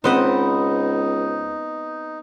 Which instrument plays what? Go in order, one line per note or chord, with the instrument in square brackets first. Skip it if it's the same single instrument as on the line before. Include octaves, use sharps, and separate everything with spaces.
[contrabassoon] C#2 [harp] B3 C4 B4 [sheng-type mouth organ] D#4 [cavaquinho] C5 D#5 F#5